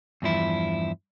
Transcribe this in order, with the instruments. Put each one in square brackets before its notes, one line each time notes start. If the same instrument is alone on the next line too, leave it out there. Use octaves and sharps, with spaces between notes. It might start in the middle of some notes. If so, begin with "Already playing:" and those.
[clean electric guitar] E2 G2 F3 E4